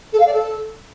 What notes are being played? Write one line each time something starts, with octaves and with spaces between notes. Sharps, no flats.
A4
F5
D5
A4